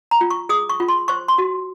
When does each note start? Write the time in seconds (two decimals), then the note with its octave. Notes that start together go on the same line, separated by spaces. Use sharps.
0.11 A#5
0.21 F4
0.30 C#6
0.49 G#4 D#6
0.70 C#6
0.80 F4
0.88 C6
1.08 C5 C#6
1.28 C6
1.38 F#4